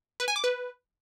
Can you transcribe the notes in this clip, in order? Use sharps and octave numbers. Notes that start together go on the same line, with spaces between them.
B4
G#5
D6
B4